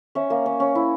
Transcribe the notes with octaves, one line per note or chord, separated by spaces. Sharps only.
C#4 E5
A#3
C#4
C#4
E4